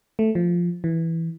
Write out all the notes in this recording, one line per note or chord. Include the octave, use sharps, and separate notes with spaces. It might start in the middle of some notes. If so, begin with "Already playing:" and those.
A3
F3
E3